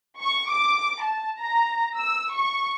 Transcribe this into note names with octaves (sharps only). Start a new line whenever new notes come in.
C#6
D6
A5
A#5
E6
C#6